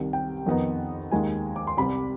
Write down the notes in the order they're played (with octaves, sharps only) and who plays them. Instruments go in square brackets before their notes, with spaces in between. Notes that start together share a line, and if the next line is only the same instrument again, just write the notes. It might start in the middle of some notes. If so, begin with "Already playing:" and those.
Already playing: [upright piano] C2 C3 D#3
G5
F2 D#3 B3 D#4
D#2 D#3 G#3 G#5
D6
C6
C2 C3 G3 B5